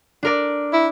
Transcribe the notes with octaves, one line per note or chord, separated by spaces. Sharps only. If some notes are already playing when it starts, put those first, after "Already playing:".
D4 A#4 D5
E4